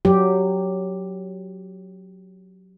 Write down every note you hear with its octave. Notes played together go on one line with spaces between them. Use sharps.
F#3 G4